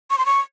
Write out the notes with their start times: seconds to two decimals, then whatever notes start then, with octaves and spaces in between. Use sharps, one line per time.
0.10 C#6
0.18 C6
0.26 C#6